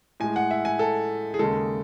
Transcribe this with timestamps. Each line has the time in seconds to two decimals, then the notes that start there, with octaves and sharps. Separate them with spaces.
0.20 A2 G#3 G#5
0.36 F#5
0.51 E5
0.65 G#5
0.79 A4
1.34 G#4
1.39 D#2 C#3 G#3 A4